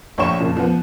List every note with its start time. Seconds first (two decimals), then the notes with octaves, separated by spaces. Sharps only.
0.18 A#1 C#5 G5 C#6 E7
0.40 F2 A#2 C#3
0.57 F3 B3